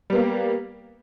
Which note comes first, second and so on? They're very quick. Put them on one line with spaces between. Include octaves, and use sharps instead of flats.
G3 B3 A#3